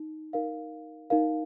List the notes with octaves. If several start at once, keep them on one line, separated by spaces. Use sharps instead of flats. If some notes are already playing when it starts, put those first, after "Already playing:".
Already playing: D#4
D#4 A#4 F5
D#4 A#4 F5